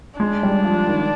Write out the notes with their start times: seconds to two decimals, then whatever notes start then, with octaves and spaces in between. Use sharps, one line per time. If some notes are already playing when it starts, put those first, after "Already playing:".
0.20 G#3 D4
0.43 G3
0.65 F3
0.88 D#3